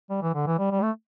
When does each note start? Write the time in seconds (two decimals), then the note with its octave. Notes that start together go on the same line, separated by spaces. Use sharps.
0.10 G3
0.22 E3
0.35 D3
0.47 E3
0.59 G3
0.71 G3
0.82 A3